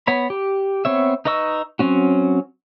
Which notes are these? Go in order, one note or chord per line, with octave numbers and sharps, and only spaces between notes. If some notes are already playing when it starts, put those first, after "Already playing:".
B3 C#5 B5
G4
B3 C4 C#5 E5
D#4 B4 D#5 C#6 E6
F#3 C4 C#4 F#4